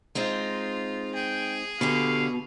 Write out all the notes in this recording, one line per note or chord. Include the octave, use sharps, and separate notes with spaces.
G#3 C4 D#4 F4
G#4 G5
B2 D3 G4 A4 F5